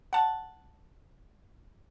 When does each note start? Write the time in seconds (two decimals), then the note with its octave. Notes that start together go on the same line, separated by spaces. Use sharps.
0.13 F#5 A5